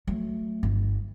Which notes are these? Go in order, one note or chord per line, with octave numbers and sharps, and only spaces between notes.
F#3 A3
G1